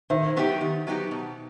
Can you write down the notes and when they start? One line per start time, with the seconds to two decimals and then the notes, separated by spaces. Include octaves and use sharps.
0.10 D#3 C5 E5
0.36 F#3 B3 D#4 G4
0.61 D#3
0.87 F#3 B3 D#4 G4
1.11 B2